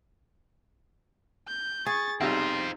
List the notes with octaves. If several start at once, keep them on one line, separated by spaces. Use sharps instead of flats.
G6
G#4 C#6 A6
B1 C3 G3 C4 D#4 F4